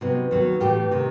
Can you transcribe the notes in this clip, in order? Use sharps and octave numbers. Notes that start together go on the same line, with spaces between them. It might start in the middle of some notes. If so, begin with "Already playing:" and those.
C3 F#3 B3 D#4
D#2 D#3 F#3 B3
A2 E3 A3 G4
C3 D#3